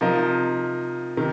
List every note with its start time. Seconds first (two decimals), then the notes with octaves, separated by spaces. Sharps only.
0.01 C3 F3 D#4 A#4 D#5
1.17 C3 D#3